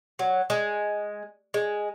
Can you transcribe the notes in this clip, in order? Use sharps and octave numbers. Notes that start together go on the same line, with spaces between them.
F#3
G#3
G#3